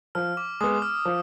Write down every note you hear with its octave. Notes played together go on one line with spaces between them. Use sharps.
F3 F6
D6
G#3 B3 D#6
F6
F3